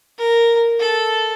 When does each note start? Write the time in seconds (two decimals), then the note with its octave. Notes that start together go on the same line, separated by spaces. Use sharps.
0.18 A#4
0.80 A4